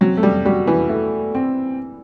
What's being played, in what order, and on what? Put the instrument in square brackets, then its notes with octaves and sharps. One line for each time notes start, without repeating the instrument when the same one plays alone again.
[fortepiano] F#3 [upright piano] C4
[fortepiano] A3
G3
[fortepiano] G3 [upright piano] F#4
[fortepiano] E3
[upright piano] A3
C4